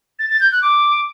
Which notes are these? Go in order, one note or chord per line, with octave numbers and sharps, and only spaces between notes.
A6
A6
G6
F#6
D6